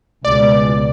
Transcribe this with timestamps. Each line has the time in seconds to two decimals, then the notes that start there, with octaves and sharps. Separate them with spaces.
0.25 C#2 B2 G#3 D5